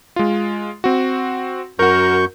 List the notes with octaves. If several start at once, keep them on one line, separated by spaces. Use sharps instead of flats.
G#3 F4
C4 F#4
F#2 F#4 A#4 C#6 G6